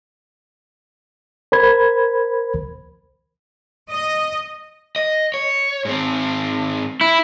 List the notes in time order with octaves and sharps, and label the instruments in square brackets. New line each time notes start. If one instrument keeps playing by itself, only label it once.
[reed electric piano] A#4 C5 B5 G#6
[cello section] D#5
[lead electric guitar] D#5
C#5
G#2 C4
[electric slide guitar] E4